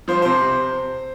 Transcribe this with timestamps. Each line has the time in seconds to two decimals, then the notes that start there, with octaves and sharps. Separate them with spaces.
0.08 F3 C5
0.22 C3 C5
0.41 C3